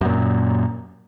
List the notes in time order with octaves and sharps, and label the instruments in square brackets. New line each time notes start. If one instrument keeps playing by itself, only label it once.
[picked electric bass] F#2 A#2